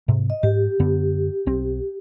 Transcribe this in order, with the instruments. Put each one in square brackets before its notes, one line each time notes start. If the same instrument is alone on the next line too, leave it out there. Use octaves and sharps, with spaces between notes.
[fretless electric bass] G#2 C3
[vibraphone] D#5
[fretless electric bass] G#2 [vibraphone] G4
[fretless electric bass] F#2 D3 B3
B1 C4